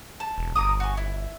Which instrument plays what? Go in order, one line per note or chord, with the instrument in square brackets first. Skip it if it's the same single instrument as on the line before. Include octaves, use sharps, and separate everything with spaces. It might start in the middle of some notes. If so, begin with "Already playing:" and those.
[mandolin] A5
[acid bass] E1
[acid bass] G1 [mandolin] A#5 D6 D#6
[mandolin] F#4 G#5
E4